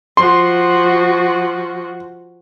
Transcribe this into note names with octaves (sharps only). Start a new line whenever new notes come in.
F3 F#4 C6